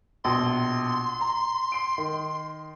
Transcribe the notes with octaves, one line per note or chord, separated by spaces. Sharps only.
A#1 B2 C6
A#5
C7 D7
D#3